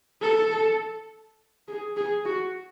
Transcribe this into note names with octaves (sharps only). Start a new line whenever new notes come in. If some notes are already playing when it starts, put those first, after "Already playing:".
A4
G#4
G#4
F#4